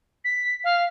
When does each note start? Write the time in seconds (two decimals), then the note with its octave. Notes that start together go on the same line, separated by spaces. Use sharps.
0.24 B6
0.64 F5